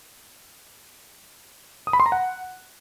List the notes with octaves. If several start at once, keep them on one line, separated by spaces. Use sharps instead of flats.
D#6
B5
C6
A#5
F#5